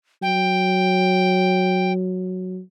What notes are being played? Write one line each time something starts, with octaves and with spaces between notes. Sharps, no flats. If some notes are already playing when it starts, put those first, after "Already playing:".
F#3 G5